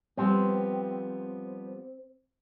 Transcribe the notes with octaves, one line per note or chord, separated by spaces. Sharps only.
F3 G3 B3 C4